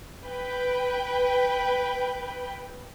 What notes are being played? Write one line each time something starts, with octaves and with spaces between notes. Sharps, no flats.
B4 G5